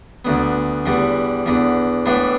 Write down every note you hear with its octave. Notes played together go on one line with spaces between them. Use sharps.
D2 D3 B3
E2 D3 G3 B3
E2 D3 B3
A2 E3 B3 D4